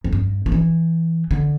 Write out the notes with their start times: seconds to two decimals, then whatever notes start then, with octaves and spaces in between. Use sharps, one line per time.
0.04 F2
0.13 G2
0.46 F3
0.52 E3
1.31 D3